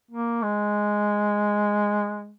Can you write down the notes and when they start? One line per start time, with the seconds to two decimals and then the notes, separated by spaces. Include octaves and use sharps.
0.11 A#3
0.43 G#3